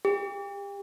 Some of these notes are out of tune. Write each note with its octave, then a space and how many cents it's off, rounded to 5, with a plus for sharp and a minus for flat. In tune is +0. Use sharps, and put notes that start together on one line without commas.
G4 +35